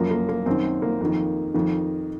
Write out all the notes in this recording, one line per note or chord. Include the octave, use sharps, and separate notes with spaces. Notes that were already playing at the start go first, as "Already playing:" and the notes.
Already playing: F#2 F3 A#3
A#3
A#3
F#2 D#3 C4
A#3
F2 D#3
F2 D#3